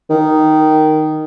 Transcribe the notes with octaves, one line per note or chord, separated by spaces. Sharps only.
D#3